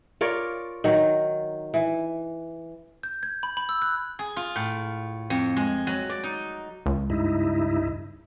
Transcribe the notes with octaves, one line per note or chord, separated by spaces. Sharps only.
F4 A#4 C#5 D5
D#3 F#3
E3
G6
G#6
B5
B5
E6
F#6
G#4
F4
A2
F2
G#3
F#3
D5
D#4
C#2
G2 D#4 E4